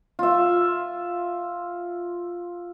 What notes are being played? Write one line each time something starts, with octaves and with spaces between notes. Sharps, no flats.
F4 E5